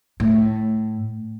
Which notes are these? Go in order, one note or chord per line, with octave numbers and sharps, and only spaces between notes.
A2